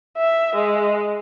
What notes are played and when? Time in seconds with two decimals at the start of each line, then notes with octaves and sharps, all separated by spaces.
0.17 E5
0.56 G#3